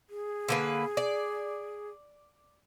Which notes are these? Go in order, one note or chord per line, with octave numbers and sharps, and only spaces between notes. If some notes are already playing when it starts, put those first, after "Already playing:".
G#4
D3 A#3 B4
D5